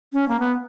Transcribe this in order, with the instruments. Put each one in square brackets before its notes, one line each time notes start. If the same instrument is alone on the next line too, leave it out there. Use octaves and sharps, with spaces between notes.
[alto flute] C#4
A#3
B3